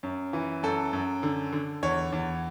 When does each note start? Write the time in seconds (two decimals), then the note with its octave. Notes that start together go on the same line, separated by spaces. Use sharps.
0.03 F#2
0.33 E3
0.63 F#2 A4
0.93 F#2
1.23 D3
1.53 D3
1.83 E2 C#5
2.12 E2